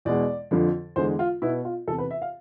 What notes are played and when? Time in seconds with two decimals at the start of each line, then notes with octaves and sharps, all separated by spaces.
0.05 E2 B2 G#3 D5
0.51 F2 D3 F3
0.96 E2 D3 G#3 C5
1.19 F4
1.42 B2 B3 E4
1.65 F4
1.87 E2 C3 E3 A4
1.98 B4
2.11 E5
2.22 F5